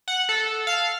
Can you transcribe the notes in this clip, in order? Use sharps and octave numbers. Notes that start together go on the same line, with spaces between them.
F#5
A4
F5